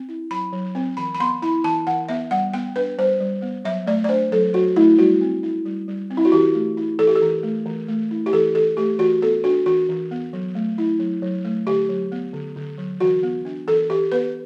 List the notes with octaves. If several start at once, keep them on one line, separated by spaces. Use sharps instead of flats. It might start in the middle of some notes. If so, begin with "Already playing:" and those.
Already playing: C4
E4
F#3 B5
F#3
C4
E3 B5
B5
B3 C6
E4 B5
E3 A5
E3 F#5
B3 E5
G3 F#5
B3 G5
D4 B4
G3 C5
G3
B3
F#3 E5
A3 D5
D5
D4 C5
F#3 A4
F#3 F#4
A3 E4
G3 F#4
C4
E4
G3
G3
C4
E4
F#4
E3 G4
A3
E4
E3 A4
G4
A4
E3
A3
E3
A3
E4
G4
E3 A4
E3 A4
A3 G4
E3 F#4
B3 A4
D4 F#4
E3 F#4
E3
B3
F#3
A3
E4
F#3
F#3
A3
D3 G4
F#3
B3
D3
D3
F#3
E3 F#4
B3
D4
E3 A4
E3 G4
B3 B4